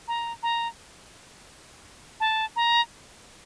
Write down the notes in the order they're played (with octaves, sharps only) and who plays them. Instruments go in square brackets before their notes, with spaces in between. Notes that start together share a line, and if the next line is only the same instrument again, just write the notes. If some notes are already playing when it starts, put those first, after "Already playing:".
[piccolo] A#5
A#5
A5
A#5